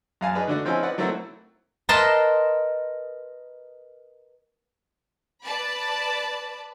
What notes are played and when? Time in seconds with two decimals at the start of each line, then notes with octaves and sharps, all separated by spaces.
0.21 F#2 F5 G#5 A5
0.34 D#4 G#4 B4 D5
0.47 D3 A3 D4 F#4
0.65 F3 C4 C#4 D#4 E4 G#4
0.83 B4 D5 D#5 F#5
0.98 F#3 A3 A#3 C4 E4 F#4
1.89 A#4 B4 D#5 A5 C6
5.44 B4 D5 A5 B5